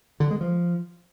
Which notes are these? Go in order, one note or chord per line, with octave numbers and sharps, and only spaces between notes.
D3
G#3
F3